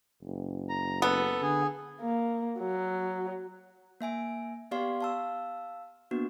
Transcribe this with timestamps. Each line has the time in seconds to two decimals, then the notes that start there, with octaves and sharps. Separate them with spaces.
0.22 F#1
0.69 A#5
1.02 B3 A4
1.42 D3 G#4
2.01 A#3
2.59 F#3
4.01 A#3 E5 G#5 D7
4.71 B3 G4 D5 F5 C6
5.01 F5 A5 E6
6.11 A#3 B3 D4 F#4